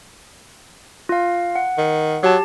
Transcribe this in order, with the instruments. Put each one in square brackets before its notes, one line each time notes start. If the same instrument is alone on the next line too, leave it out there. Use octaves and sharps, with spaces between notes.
[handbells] F4 F5
F#5
[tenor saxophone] D#3
[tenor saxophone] F#3 [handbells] G4 A5